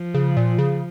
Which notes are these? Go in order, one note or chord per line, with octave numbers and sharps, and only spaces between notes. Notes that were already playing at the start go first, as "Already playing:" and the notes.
Already playing: F3
C#3
A#2
C#3